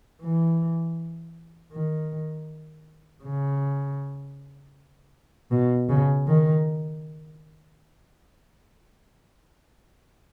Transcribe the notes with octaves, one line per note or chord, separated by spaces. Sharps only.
E3
D#3
C#3
B2
C#3
D#3